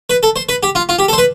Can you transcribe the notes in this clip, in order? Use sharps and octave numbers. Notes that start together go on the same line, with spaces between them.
B4
A4
C5
B4
G4
F4
F4
G4
A4
C5
B4